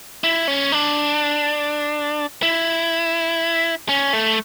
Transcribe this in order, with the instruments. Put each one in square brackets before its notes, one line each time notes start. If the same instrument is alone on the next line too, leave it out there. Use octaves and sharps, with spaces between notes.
[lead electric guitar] E4
C#4
D4
E4
C#4
A3